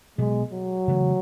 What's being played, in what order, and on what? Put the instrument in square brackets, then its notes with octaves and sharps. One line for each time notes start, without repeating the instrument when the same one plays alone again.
[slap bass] B2 F#3 B3 [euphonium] G#3
[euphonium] F#3
[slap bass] C#3 E3 A3